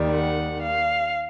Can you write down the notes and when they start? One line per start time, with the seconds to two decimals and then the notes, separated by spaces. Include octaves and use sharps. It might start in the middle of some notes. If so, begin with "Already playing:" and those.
Already playing: D#2 D#3 G3
0.13 F#5
0.62 F5